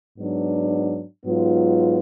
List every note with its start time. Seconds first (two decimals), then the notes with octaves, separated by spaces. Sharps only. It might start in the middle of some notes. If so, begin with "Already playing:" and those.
0.18 G#2 F#3 B3 D4
1.24 G#2 F#3 B3 F4